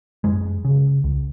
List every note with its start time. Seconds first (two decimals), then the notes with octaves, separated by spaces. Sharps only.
0.24 F#2 G#3
0.65 C#3
1.04 C#2